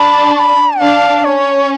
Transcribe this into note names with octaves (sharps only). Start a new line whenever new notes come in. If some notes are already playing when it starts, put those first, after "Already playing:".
Already playing: D4 B5
C#6
B5
D4 F5
C#4 C#5